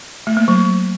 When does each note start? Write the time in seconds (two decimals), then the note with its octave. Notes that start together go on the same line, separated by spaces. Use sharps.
0.27 A3
0.37 A#3
0.48 F#3